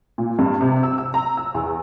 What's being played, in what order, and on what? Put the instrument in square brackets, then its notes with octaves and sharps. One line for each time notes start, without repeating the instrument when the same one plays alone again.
[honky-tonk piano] A#2
G2
C3
E6
E6
A#5
E6
E2